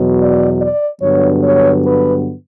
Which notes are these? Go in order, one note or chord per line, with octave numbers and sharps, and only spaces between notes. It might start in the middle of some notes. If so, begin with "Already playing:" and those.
Already playing: E2 B2 F#3
D5
D5
G2 D3 F#3 B3 C#5
C#5
B4